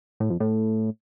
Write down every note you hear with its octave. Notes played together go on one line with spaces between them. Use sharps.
A2
F2
A2